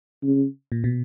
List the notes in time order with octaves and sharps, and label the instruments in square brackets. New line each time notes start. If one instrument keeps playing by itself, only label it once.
[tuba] C#3
[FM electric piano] A#2
B2